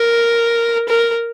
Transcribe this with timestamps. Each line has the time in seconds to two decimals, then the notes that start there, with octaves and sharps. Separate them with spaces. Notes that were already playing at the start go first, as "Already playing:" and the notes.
Already playing: A#4
0.88 A#4